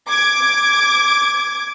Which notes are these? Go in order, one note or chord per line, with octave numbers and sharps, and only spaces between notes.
D6 G#6